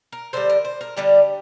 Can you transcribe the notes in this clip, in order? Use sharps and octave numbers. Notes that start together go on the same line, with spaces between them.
A#4
D3 G3 C5
A#4
C5
A#4
D3 G3 G4